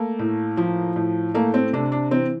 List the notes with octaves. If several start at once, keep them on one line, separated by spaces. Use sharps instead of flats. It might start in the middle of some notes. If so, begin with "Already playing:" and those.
Already playing: A3 A#3
A2
F3
A2
A3 A#3
C4
C3 D4
D4
E3 C4